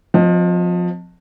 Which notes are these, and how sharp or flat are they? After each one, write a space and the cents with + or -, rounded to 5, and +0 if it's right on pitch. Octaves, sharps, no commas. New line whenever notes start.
F3 +25 C4 -25 D#5 +0